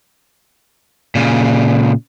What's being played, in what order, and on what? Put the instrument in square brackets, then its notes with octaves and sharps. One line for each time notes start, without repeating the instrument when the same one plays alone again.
[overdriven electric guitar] A#2 C#3